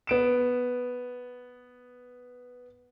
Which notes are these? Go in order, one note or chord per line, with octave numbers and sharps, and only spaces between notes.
B3 D7 E7